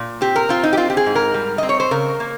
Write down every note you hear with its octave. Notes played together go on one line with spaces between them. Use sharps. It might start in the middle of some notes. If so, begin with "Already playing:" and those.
Already playing: A#2
C4 G4
A#4
C4 F4
D#4
G4
C4 F4
G4
G#4
G#2
A#4
G3
C4 D#5
C#5
C5
C#3 A#4
A#3